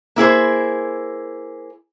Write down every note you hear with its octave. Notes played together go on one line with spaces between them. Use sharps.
A#3 E4 G#4 C5